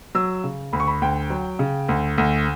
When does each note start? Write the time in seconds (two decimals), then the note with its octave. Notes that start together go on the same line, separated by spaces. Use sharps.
0.15 F#3 E6
0.44 C#3
0.73 D2 B5
0.80 C#6
0.88 B5
1.01 D2 G5
1.30 F#3
1.59 C#3
1.89 D2
2.18 D2